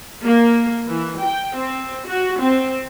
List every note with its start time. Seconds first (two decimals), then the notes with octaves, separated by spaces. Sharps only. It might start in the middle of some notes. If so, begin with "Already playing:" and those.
0.23 A#3
0.88 E3
1.21 G5
1.57 C4
2.07 F#4
2.42 C4